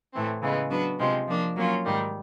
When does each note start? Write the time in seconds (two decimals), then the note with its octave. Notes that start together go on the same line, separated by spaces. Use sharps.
0.13 A2 E3 A3 C4
0.42 C#3 E3 G#3 B3
0.70 F#3 B3 D4 F#4 B4
0.99 C3 F3 G#3 C4
1.27 F3 A#3 D4
1.56 F#3 A#3 C#4 F4
1.85 G#2 D#3 G3